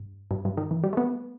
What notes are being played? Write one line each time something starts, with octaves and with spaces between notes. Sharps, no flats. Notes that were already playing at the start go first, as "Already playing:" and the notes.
Already playing: G2
G2
G2
D#3
E3
G3
A3
B3